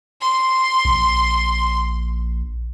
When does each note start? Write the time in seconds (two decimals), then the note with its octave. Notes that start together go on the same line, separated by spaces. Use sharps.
0.21 C6
0.85 A#1